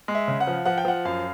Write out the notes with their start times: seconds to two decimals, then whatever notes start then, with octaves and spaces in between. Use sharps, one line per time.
0.08 G#3
0.15 E5
0.28 C#3
0.40 F#5
0.47 F3
0.66 F3 F#5
0.78 G5
0.85 F3 F#5
1.05 F#2 F5